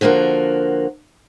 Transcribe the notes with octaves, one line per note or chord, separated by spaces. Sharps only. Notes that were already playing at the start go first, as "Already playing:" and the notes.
D3 F3 A#3 F#4 A#4